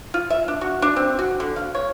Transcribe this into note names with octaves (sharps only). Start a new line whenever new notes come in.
F4
E5
D4
F#4
D4
C4
F#4
D3
F5
C#5